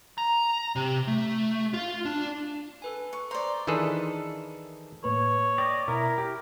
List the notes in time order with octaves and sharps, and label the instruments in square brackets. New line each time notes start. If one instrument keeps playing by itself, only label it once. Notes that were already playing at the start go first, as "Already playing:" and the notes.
[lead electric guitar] A#5
C3
A3
F4
D4
[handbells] A4 B4 G#5
[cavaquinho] C#6
[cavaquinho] C5 D5 [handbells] A#5 C6
[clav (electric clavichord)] D#3 E3 D4 G#4 A4 B4
[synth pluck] A2 A#3 B4 [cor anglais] C#5
[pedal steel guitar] D5 D#5 [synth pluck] G5
[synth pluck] B2 [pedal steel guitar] E4 [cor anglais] A#4
[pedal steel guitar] G4